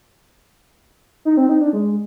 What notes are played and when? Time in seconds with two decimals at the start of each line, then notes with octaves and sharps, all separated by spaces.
1.25 D#4
1.37 C4
1.49 D#4
1.61 D4
1.73 G#3